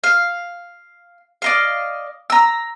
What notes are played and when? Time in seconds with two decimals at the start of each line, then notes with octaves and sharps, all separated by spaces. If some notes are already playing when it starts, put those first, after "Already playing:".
0.04 F5
1.42 D5 D#5 F5
2.30 A#5 E6